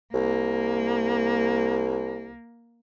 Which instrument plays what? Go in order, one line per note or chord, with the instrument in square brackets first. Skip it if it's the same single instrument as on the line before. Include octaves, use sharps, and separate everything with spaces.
[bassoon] C2 [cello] A#3